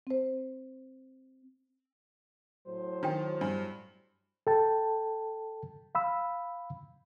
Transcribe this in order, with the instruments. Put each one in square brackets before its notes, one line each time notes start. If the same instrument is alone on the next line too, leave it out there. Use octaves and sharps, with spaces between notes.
[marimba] C4 C5
[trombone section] A2 F#3 C5
[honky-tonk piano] D#3 [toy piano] D4 F#4 G5
[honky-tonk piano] G2 [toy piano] D4
[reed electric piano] A4 G5 A5
F5 B5 E6